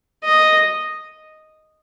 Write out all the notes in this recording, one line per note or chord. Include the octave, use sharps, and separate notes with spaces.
D#5